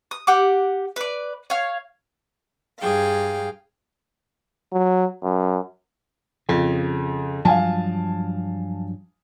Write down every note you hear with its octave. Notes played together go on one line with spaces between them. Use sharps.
D#6
G4 F#5 D6
B4 D5
C#5 F5
G2 G#4 F5 G5
F#3
F#2
F2 C#3
G2 F3 F#3 F5 G#5 A5